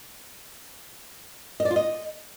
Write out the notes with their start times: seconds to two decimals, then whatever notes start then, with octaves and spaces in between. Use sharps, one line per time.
1.60 D#5
1.65 D5
1.71 F4
1.76 D#5